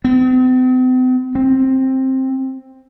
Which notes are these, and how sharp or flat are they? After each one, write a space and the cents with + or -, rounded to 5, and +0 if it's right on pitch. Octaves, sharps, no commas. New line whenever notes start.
C4 -45
C4 +10